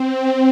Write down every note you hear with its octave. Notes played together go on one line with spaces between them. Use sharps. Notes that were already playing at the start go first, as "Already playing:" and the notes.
Already playing: C4